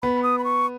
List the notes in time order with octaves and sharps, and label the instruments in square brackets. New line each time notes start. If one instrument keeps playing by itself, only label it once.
[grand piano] B3 [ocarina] B5
[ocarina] D#6
B5
C#6